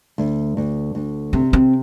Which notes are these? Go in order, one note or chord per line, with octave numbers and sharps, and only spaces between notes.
D2
D2
D2
C3 C4
C4